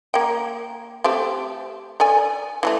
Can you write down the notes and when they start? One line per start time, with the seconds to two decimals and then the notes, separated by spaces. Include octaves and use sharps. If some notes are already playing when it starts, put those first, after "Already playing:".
0.14 A#3 G5
1.04 A3 C4 G4
2.00 A4 D5 G#5
2.63 E3 G#3 A3